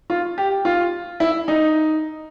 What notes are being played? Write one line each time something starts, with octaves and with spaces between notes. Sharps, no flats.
F4
G4
F4
E4
D#4